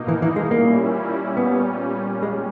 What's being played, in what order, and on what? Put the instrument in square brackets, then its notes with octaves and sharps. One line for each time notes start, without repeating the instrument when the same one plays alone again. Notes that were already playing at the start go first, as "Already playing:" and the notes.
Already playing: [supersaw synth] B2 A#3 D#4
[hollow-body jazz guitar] E3
E3
G#3
[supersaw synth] A#2 G3 C#4 E4 [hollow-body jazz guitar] A#3
[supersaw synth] A#2 G3 C#4 [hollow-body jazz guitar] B3
[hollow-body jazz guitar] G#3